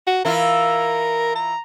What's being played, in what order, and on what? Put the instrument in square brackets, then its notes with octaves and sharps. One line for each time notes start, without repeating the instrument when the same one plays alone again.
[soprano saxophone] F#4
[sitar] E3 E4 F4 [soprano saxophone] A#4
[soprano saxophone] A#5